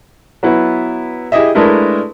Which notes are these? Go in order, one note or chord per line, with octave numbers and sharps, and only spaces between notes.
F#3 B3 E4 B4
E4 G4 G#4 D#5 E5
G#3 A3 D4 E4 A#4 B4